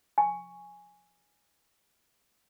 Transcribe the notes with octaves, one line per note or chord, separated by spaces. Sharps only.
G#5 C#6